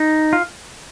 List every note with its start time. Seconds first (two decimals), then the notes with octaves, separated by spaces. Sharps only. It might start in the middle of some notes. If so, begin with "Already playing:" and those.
Already playing: D#4
0.33 F4